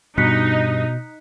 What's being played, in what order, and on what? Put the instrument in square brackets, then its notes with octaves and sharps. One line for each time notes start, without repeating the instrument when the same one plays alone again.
[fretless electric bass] G2 [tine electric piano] B2 [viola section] D#4 [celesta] F#6 B6 C#7